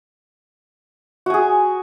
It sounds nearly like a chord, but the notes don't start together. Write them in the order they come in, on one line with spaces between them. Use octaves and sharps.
F#4 G#5 G#4